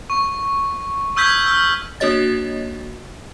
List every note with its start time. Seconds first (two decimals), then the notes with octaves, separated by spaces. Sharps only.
0.10 C#6
1.16 C#6 E6 F6 G6 G#6 B6
1.46 E6 F6
2.00 A#3 D4 F#4 C#5 D#5 A6